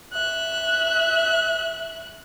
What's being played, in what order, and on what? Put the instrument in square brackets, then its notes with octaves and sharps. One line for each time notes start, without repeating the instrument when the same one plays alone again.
[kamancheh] E5 F#6